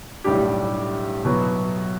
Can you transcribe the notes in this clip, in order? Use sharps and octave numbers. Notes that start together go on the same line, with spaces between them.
B1 A2 G3 D4 G4
B2 F#3 B3 E4